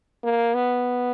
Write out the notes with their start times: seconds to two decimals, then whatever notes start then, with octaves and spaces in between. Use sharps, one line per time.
0.23 A#3
0.55 B3